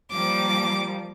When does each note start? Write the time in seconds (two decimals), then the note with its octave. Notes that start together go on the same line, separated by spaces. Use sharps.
0.11 F3 G3 A#3 D6